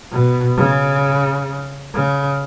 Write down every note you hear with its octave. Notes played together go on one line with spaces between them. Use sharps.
B2
C#3
C#3